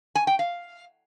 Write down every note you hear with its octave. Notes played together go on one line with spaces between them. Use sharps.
G#5
G5
F5